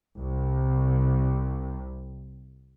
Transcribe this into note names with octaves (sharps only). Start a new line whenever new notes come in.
C2 C3